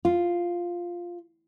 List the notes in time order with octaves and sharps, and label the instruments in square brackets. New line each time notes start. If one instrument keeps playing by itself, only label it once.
[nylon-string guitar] F4